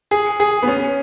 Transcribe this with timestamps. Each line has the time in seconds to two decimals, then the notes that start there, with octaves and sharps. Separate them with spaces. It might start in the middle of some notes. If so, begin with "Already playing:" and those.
0.11 G#4
0.40 G#4
0.63 B3
0.67 C#4